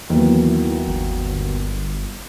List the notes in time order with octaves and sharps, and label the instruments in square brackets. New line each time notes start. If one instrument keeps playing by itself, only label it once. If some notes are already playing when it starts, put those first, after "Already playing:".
[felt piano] D#2 F#3 B3 [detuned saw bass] E3
[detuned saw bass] G1